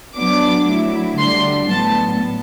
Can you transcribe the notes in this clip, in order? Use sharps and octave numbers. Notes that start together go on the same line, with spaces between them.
F#3 B3 D4 D6
F#3 A3 E4
D3 G3 D4 C6
A2 F#3 B3 A5